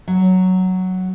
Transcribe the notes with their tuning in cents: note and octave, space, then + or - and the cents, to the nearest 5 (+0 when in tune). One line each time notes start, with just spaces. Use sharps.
F#3 +5